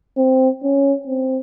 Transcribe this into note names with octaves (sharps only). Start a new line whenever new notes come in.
C4
C#4
C4